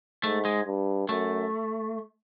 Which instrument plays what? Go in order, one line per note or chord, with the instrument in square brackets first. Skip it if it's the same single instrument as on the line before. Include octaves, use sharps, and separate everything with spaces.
[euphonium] G#2 [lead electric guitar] A3
[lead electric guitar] G#3
[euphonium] G2
[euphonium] F#2 [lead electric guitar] A3